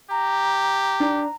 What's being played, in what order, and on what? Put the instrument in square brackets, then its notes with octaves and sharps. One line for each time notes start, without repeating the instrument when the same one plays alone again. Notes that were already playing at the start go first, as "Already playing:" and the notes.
[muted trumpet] G4 [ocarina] A#5
[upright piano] D4